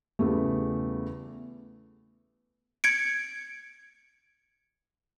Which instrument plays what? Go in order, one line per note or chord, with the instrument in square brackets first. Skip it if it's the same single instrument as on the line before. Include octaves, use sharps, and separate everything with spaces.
[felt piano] E2 C#3 G3 A3
[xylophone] G#6 C#7 D7